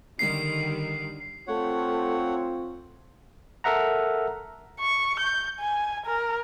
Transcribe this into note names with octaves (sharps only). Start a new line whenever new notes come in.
D3 D#3 G3 C7
A3 C4 F4 C#5 F#5
A4 A#4 E5 F#5 A#5
C#6
G6
G#5
A#4